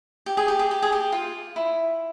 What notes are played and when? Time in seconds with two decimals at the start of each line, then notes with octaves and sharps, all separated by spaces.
0.26 G4
0.37 G#4
0.48 G4
0.59 G#4
0.71 G4
0.82 G#4
0.92 G4
1.12 F4
1.56 E4